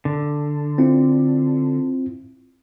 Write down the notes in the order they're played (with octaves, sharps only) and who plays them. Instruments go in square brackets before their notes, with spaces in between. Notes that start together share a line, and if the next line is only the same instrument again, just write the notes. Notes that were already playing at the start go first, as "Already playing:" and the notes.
[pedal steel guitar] D3
[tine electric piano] C4 E4 F4